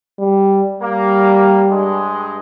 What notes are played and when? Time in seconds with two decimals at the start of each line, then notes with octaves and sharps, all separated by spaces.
0.19 G3
0.80 G3 A#3
1.68 G2 G#3